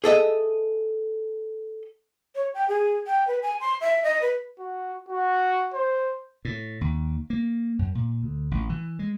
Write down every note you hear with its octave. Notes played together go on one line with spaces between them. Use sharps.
G#4 A4 D#5 E5
C#5
G5
G#4
G5
B4
G#5
C6
E5
D#5
B4
F#4
F#4
C5
A2
D#2
A#3
F#2
A#2
D2
A1
E3
G#3